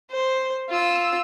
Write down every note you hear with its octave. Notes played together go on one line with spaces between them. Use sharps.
C5
F4 E6